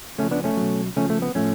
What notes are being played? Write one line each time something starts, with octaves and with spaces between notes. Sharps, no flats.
C#3 F3 A3 C#4
B3 D4
A3 C#4
B2 F#3
C#3 F3 A3 C#4
A3
B3
A2 F3 A3 C#4